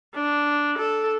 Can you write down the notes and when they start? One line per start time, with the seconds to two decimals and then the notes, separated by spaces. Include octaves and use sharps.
0.14 D4
0.78 A4